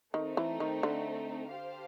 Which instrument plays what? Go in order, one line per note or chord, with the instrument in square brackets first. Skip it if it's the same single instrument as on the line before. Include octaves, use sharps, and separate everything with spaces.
[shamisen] D#3 [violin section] A3 C4 D#4
[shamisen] E3
D#3
D3
[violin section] G4 C5 F5 A5